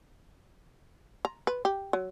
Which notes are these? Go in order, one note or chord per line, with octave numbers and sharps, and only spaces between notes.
A#5
B4
G4
F#3